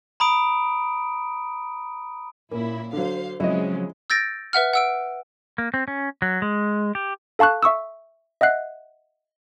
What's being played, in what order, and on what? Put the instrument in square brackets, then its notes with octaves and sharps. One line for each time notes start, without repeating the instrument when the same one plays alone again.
[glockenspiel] A#5 B5 D#6 D7
[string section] A#2 E4 [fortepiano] A#3 [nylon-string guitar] C#4
[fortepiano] D3 F#3 [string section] C5 F5
[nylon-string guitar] C#3 F#3 C4 [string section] F3 G#3 C#4 [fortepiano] E4 D#5
[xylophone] E6 G6 A6 A#6 D7
B4 E5 F#5 F6
F#5 E6 D7
[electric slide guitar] A#3
C4
C#4
F#3
G#3
G4
[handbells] A4 F5 A5 C#6 F#6
E5 C#6 D#6 E6
D#5 E5 F#5 F#6 C7